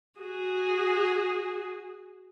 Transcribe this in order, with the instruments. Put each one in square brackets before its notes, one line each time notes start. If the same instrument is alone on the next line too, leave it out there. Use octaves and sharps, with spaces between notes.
[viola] F#4 G#4